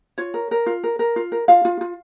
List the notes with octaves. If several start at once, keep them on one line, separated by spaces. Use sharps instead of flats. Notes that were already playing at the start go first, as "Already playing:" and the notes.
F4 C#5
A#4
A#4
F4
A#4
A#4
F4
A#4
F4 F5
F4
F4